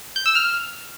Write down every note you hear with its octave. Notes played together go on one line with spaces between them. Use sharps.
G6
E6
F6